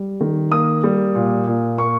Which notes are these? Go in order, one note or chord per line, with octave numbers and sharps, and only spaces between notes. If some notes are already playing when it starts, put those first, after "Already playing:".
Already playing: G3
D#3
A#3 D#6
G3
A#2
A#2
A#3 C#6